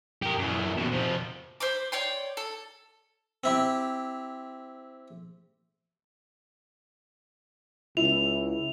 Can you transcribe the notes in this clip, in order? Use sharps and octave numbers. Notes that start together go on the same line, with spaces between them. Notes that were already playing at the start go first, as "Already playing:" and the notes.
G4 A#4
F#2 E3
D#2 B2
C3 F3
C5 B5 D6
C#5 D5 G5 C6
A4
C4 E4 G4
C#2 E4 F7